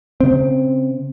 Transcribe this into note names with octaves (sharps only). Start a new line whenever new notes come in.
C#3 C4